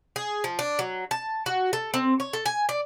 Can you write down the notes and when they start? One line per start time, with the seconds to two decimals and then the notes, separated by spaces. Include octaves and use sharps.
0.16 G#4
0.44 F3
0.59 D4
0.79 F#3
1.11 A5
1.46 F#4
1.73 A4
1.94 C4
2.20 C#5
2.33 A4
2.46 G#5
2.69 D5